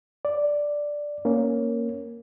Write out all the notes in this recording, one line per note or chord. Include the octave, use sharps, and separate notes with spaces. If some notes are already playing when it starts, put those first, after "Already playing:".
D5
A#3 C#4